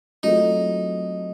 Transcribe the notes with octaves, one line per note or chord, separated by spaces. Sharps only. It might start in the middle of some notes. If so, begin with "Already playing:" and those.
F#3 A3 C4 D#4 F4 A4